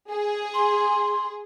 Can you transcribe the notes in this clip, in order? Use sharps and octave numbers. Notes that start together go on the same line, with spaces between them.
G#4
C6